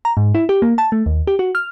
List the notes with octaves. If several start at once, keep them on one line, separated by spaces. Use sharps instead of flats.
A#5
G#2
E4
G4
A#3
A5
A3
D#2
G4
F#4
F6